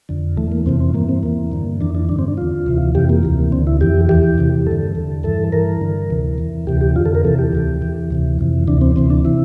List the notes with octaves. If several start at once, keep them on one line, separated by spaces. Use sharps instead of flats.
F2 D3
E2 E3 A3
A#3
F2 C3 E3 C4
C4
G2 E3 A#3
C4
E2 E3 A#3
G2 D3
F2 E3 D4
D4
G2 D3 D4
C4
D4
E2 D3 F4
D2 C3 E3
F2 C3 E3 G4
A#3
D2 C3 E3
D2 D3 C4
E4
F2 E3 G4
E2 E3 G4
E2 C3 E3
G2 D3 A4
E2 D3
G2 E3 A4
G2 E3 A#4
G2 D3
D2 C3 E3
E2 E3
D2 C3 E3 G4
G4
F2 D3 F4
A4
A#4
E2 C3 E3 A4
G4
D2 C3 E3
E2 E3
D2 C3 E3
F2 C3 E3
D2 C3 E3 D4
C4
D2 C3 E3 C4
D4
C3 E3 E4